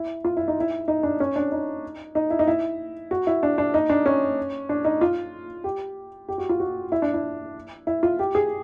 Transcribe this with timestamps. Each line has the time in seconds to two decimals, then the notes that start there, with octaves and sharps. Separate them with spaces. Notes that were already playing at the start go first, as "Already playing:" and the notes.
Already playing: E4
0.24 F4
0.37 E4
0.48 D#4
0.60 E4
0.88 D#4
1.03 D4
1.20 C#4
1.36 D4
1.52 D#4
2.15 D#4
2.30 E4
2.39 D#4
2.47 E4
3.11 F#4
3.27 E4
3.43 D4
3.58 D4
3.74 D#4
3.89 D4
4.06 C#4
4.69 D4
4.85 D#4
5.01 F4
5.64 G4
6.28 G4
6.38 F#4
6.49 F4
6.60 F#4
6.92 E4
7.02 D4
7.14 E4
7.87 E4
8.03 F4
8.19 G4
8.35 G#4